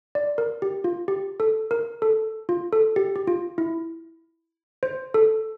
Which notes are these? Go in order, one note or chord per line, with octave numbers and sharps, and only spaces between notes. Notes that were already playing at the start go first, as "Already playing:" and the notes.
D5
A#4
G4
F4
G4
A4
A#4
A4
F4
A4
G4
G4
F4
E4
C5
A4